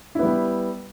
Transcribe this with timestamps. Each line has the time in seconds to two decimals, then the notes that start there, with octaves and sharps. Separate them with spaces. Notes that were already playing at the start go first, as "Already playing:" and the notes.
0.15 E4
0.19 B3
0.23 G3